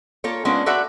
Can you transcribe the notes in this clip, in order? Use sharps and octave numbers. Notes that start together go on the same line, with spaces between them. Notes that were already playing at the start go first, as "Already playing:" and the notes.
A#3 F4 A4 C#5
G#3 A#3 B3 C#4 D4 F4
F#4 A4 B4 D5 E5 F#5